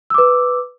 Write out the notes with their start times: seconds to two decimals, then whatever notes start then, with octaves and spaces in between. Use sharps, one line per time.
0.10 E6
0.14 D6
0.18 B4